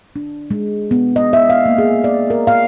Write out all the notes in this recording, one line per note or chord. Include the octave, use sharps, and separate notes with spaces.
D4
G#3
B3
D#5
E5
F5
A#3
G#4
D5
A#4
F5